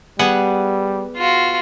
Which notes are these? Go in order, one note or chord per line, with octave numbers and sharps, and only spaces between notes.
G3 B3 G#4 F#5
F4 F#4